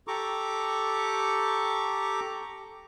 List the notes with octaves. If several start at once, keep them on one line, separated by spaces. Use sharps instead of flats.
G4 A4 A#5 C#6 D6